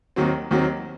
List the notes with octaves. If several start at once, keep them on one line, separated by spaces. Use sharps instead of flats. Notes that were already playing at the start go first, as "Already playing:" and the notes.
D#2 D#3 F#3 C4
D#2 D#3 F#3 C4